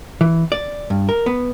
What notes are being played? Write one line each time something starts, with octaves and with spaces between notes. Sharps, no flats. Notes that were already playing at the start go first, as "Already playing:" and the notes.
E3
D5
G2
A#4
B3